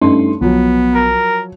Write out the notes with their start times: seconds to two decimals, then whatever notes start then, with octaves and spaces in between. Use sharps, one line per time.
0.01 G2 A3 C#4 D#4 C6
0.41 B1 F3 F#3 B3
0.95 A#4